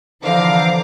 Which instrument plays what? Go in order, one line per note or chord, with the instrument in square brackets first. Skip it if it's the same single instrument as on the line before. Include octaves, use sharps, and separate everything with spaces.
[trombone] D3 [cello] E3 F3 [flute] C5 [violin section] F5 A#5 D6